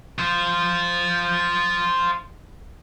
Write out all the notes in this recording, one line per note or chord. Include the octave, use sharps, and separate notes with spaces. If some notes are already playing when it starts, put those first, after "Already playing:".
F4 C5